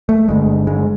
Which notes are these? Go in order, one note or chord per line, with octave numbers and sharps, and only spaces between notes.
A3
G1 G2 D3 G#3
G#3